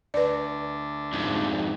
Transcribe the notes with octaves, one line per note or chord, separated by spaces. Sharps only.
D2 D4 B4 D5
F2 G#2